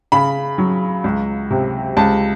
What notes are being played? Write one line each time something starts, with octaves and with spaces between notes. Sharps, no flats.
C#3 B5
F#3
C#2
C3
C#2 A5